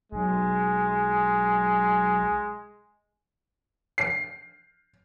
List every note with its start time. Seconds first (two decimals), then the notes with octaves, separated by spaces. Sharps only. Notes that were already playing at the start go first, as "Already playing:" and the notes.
0.12 B1 G#3
3.98 C7